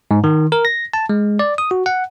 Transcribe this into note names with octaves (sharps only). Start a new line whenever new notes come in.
G#2
D#3
A#4
A#6
A5
G#3
D5
D#6
F#4
F#5